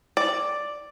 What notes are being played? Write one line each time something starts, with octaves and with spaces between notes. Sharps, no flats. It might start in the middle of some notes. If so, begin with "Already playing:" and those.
D5